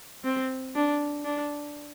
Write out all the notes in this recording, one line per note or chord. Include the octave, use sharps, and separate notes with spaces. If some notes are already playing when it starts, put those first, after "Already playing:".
C4
D4
D4